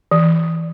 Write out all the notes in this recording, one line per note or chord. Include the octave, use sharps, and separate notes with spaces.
E3